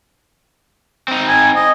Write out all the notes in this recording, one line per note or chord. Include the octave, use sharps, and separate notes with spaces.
C4 D#4
G#5
D#5